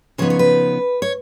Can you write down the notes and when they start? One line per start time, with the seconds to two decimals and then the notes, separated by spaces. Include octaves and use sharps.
0.18 C#3 F3 B3 D#4 C#5
0.30 C#5
0.39 B4
1.02 C#5